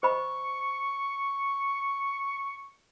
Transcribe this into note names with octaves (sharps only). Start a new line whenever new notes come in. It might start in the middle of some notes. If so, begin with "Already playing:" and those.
C5 D#5 B5 C#6